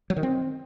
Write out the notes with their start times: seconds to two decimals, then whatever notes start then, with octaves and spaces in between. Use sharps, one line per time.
0.10 F#3
0.16 D#3
0.23 C4